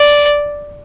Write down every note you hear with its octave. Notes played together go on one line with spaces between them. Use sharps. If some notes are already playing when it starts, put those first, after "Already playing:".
Already playing: D5